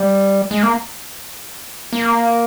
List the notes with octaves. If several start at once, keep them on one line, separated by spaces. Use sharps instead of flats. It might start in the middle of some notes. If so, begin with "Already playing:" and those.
Already playing: G3
G#3
A#3
A#3